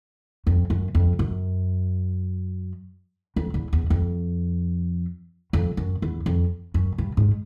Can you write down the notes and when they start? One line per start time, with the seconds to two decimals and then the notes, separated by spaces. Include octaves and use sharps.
0.47 F2
0.70 F#2
0.95 F2
1.19 F#2
3.36 F2
3.54 E2
3.73 E2
3.90 F2
5.53 F2
5.77 F#2
6.02 E2
6.26 F2
6.74 F#2
6.98 G2
7.17 G#2